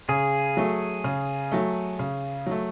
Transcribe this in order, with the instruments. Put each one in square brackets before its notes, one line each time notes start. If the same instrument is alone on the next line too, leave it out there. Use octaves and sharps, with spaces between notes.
[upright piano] C#3 [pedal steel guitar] G#4
[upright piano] F#3 A3
C#3
F#3 A3
C#3
F#3 A3